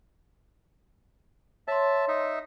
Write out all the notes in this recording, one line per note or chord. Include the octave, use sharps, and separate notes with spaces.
C#5 E5 A5 C6
D#4 E5